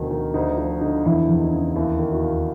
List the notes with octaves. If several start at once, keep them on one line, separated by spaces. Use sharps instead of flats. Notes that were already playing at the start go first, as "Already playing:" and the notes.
Already playing: D2 B2 D#3
D#3
D2 D#4
F3 D#4
D3 D#4
E2 E4
E2
D#4
C#3
D#2 E4
D#3
E4 F#4
D#2